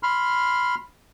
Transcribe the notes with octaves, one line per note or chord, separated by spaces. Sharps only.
B5 C6 F6